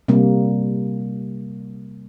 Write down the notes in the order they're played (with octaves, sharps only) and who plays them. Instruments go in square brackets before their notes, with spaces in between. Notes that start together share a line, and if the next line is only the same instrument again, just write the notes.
[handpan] C3 G3 A#3